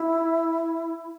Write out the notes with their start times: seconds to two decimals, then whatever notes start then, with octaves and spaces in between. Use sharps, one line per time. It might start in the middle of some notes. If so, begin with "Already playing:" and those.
Already playing: E4